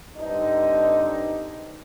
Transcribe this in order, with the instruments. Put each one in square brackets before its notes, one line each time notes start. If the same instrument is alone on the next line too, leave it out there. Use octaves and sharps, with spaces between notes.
[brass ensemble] G2 D3 C4 D4 D#4